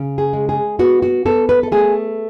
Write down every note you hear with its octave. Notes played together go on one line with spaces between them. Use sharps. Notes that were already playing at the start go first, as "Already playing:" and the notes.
Already playing: C#3
G#4
G#3
G#4
B3 F#4
F#4
B3 A4
B4
A4
A3 G#4